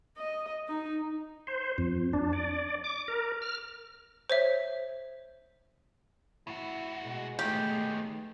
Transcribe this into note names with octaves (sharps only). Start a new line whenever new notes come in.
D#5
D#4
C5
F2
D4
D5
D6
A#4
F6
C5 C#5 E5
A2 E4 F#4
B2 G#3
D#3 A3 B3 G4